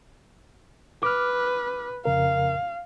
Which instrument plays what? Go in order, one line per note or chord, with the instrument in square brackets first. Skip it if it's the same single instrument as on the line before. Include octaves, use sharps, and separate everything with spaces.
[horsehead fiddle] B4 [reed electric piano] D6 F6
[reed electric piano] F2 C#3 A#4 [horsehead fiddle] F5